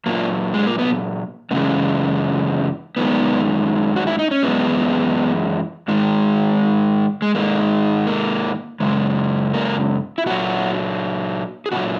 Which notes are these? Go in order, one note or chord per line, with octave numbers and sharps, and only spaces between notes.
A#2 F#3 A#3
G#3
A#3
B3
F#2 C#3 E3 G#3 A#3
F#2 D#3 G#3 B3
F#4
E4
D#4
C#4
F#2 E3 G#3 B3
G#2 D#3 G#3
G#3
G#2 D#3 G#3 A#3
A#3
F#2 C#3 G#3
A#3
E4
A#2 F#3 F#4
G#4
A#2 F#3 F#4